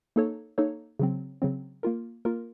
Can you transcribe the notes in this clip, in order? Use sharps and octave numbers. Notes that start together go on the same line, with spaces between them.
A#3 D#4 A4 C#5
A#3 D#4 A4 C#5
C#3 F#3 C4
C#3 F#3 C4
A#3 F4 A#4
A#3 F4 A#4